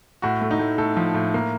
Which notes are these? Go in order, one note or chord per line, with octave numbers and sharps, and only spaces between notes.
A2 F#4
A3
D#4
A2
A2 A4
F3
A2
A#3